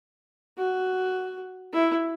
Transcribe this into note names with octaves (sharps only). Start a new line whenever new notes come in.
F#4
E4